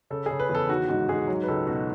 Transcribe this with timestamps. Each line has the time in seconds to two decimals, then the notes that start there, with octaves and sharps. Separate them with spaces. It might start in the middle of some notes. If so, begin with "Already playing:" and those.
0.10 C#3 A4
0.26 C#3 G#4
0.40 B4
0.49 E2
0.55 A4
0.69 D#3 F#4
0.89 G#2 F#4
1.09 G#2 G#4
1.28 F#3
1.43 B4
1.48 C#2 A4
1.67 B2 F#4